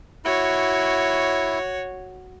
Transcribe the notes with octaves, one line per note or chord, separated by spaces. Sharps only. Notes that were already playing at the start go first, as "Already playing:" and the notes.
E4 F#4 C#5